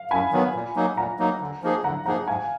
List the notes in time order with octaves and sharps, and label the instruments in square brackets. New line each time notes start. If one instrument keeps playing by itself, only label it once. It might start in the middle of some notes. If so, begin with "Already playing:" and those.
Already playing: [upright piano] F5
[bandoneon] F#2 [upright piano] G#5 B5
[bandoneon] D#3 F#3 B3
A#2
F#3 A#3 D#4
[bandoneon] A#2 [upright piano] F#5 A#5
[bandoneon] F#3 A#3 D#4
D3
F3 A#3 D#4 G#4
[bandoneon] D3 [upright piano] F#5 A#5
[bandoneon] F3 A#3 D#4 G#4 [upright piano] F#5 A#5
[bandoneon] G#2 [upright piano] F5 G#5